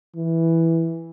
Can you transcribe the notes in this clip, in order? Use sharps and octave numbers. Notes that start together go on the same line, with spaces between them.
E3